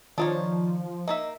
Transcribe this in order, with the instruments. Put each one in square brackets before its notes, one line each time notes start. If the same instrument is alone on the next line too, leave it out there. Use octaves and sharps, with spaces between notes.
[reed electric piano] D#3 F4 [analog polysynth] F3 [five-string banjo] D4 D#4 C#5
[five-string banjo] A#3 D#4 E5 [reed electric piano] D#5